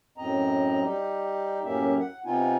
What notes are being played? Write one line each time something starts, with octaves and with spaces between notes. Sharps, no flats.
F#2 A2 C4 D#5 A#5
G3 D#4 G4
F#2 A2 A#3 C#4 G4 E5
F#5
C3 B3 C4 D#4 F4 G#5